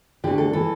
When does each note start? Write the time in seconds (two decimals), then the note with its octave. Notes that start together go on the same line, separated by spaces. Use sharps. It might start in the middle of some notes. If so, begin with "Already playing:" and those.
0.24 D2 D3 G4
0.38 A4
0.53 E3 A4